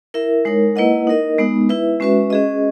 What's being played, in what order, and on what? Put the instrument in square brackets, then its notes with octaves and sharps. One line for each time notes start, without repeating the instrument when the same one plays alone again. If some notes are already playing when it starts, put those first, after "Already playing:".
[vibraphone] E4 A#4 E5
G#3 D#4 A#4 C#5
A#3 E4 B4 D#5 F#5
D#4 A#4 D#5
G#3 B3 D#4
E4 B4 E5
G#3 C#4 F#4 B4 E5
C#4 G#4 D#5